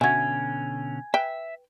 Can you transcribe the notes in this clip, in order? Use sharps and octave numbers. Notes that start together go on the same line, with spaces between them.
B2 D3 C#4 F#4 E5 G#5 G#6
B4 E5 G5